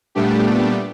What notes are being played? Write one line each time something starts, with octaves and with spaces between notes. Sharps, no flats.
A#2 G3 A3 B3 D4 G4